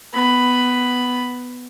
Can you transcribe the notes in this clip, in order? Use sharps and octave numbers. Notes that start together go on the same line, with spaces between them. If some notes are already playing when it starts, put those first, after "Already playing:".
B3 B5